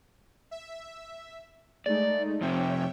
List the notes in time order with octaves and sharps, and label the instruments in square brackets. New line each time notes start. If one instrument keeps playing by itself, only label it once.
[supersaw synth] E5
[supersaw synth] G#3 A3 D#4 [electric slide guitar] D5
[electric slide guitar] F2 C3 [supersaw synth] C#5 E5 G5